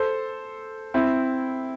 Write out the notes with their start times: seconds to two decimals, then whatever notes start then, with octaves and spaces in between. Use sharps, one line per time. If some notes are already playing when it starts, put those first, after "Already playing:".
Already playing: A4 C5
0.94 C4 E4